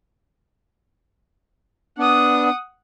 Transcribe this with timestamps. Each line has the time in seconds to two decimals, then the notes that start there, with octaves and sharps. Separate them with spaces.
1.99 B3 D4 F#5 D#6